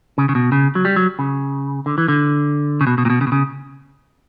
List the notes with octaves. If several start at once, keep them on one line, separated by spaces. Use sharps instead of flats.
C#3
C#3
B2
C#3
F#3
G3
F#3
C#3
D3
E3
D3
C#3
B2
B2
A#2
B2
C#3
B2
C#3